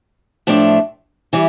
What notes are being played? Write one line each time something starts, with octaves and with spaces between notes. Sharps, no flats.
A2 F3 A3 D4
E3 G3